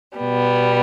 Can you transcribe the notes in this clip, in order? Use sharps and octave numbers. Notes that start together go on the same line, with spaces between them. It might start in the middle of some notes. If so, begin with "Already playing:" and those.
B2 G3 B3